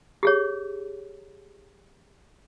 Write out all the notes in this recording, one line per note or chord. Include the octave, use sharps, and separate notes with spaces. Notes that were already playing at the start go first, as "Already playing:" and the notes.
G4 G#4 C#5